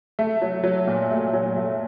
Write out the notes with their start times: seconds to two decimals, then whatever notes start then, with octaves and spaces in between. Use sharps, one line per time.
0.19 A3
0.42 F#3
0.63 F#3
0.88 A#2
1.11 A3
1.33 F#3
1.56 A3